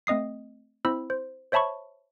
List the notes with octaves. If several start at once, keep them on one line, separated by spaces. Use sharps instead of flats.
A3 C4 D#5 D#6 C7
C4 E4 C5 B5 E6
C5
C5 C#5 E5 A5 B5 C#6